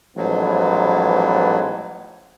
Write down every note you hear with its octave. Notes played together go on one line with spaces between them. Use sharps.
A1 G#2 F3 F#3 B3